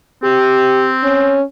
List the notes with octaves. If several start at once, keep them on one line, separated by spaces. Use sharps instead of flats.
C4 G4
C#4